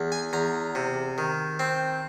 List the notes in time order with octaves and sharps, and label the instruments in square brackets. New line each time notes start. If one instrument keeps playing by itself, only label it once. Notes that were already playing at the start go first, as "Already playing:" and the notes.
Already playing: [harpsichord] E2
G#5
E2 A#5
C3
D#3
C4